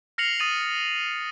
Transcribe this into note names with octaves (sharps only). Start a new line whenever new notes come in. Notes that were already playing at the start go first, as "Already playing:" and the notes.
F6 A#6 C7 C#7 F7 F#7
D#6 A6 D#7 F#7